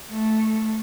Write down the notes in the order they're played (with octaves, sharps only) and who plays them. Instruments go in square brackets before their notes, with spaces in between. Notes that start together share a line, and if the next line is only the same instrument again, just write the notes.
[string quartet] A3